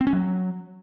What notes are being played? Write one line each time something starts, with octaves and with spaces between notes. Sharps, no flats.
C4
C#4
F#3